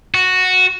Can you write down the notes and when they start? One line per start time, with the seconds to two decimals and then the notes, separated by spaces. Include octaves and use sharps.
0.15 F#4